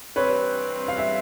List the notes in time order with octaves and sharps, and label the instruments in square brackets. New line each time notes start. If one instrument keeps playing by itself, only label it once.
[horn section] G2 E3 G3 C4 [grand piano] B4 C#5
[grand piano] F5
E5